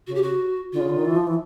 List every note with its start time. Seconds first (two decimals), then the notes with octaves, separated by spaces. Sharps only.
0.07 C#3 F#4
0.15 G4
0.22 F#4
0.73 D3 F4
0.81 C#3
0.89 D3
0.97 D#3
1.05 E3
1.16 F3
1.27 E3